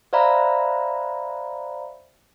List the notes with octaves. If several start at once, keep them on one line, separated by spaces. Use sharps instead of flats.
C5 D5 E5 F5 A#5 B5